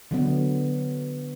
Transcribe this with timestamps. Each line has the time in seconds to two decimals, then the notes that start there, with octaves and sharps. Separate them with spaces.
0.11 D3 F#3 B3